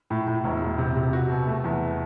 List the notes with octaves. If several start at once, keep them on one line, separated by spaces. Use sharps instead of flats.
A2
A2
E1
E1
C3
C3
F#4
B2
A3
E2